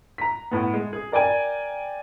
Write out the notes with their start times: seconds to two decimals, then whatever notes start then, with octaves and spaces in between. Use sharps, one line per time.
0.18 A#5 B6
0.51 A2 B3
0.74 G#3
0.93 G#4
1.12 A#4 D5 G5 G#5